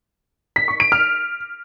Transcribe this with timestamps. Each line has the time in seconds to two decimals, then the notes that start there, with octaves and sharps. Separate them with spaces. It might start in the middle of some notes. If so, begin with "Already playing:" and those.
0.56 B6
0.68 C#6
0.80 D7
0.92 F6